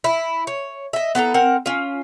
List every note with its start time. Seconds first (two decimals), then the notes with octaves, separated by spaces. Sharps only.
0.04 E4
0.47 C#5
0.93 D#5 E5
1.15 B3 E4 A4 A#5
1.34 C4 A#4 F#5
1.66 C#4 F4